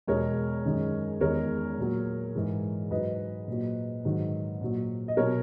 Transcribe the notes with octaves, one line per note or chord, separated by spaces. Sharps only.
E2 B2 G#3 A#4 C#5
F#2 D#3 G#3
E2 D#3 G#3 A#4 C#5
A#2 F#3
G#2 E3 G#3
G#2 F#3 B4 D#5
A#2 F#3
G#2 D#3 F#3
A#2 F#3
D#5
B2 F#3 A#4 C#5